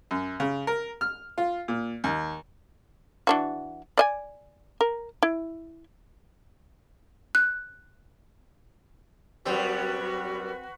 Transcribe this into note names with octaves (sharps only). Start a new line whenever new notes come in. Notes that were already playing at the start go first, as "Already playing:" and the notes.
F#2
C#3
A#4
F6
F4
A#2
D#2
E3 D4 F#4
D5 D#5 G#5
A#4
E4
F#6
F#2 G3 C4 F#4 B4